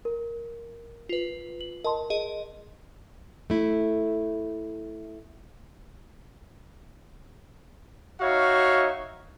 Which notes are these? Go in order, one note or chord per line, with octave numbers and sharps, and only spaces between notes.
A#4
F4 B4
F#7
A#4 D#5 A5 C6
G#4 D#5
A3 E4
D#4 F#4 C#5 E5 F5